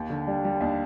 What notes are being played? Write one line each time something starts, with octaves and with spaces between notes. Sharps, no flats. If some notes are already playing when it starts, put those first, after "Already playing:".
Already playing: D#2
D3
G3 D4
G3
D#2 D4